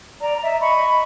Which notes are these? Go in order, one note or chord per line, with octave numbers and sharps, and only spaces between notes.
D5 A#5
D#5 E5
D#5 B5 C#6